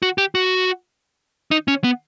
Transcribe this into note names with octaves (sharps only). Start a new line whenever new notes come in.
F#4
G4
F#4
D#4
C#4
B3